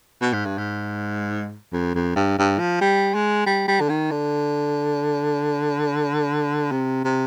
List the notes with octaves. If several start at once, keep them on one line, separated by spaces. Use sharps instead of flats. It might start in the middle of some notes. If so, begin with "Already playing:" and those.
B2
G#2
G2
G#2
F2
F2
G2
G2
F3
G3
G#3
G3
G3
D3
D#3
D3
C3
C3